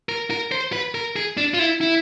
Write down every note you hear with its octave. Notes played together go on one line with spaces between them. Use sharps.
A#4
A#4
C5
B4
A#4
G#4
D4
F4
E4
E4